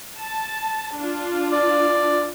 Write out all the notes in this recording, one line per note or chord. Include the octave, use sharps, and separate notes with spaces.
A5
D4 F4
D5